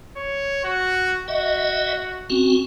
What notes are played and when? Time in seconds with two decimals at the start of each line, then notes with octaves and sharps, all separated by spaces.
0.17 C#5
0.64 F#4
1.28 F#4 D#5 E5
2.30 C4 C#4 F#4